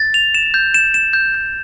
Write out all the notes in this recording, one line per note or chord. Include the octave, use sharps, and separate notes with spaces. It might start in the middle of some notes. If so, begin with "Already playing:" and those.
Already playing: A6
F7
E7
G6
E7
E7
G6
G6